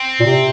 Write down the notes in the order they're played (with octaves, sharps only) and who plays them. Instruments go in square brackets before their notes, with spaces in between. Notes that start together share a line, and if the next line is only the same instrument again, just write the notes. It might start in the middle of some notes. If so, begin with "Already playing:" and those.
Already playing: [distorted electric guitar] C4
[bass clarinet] A#2
C3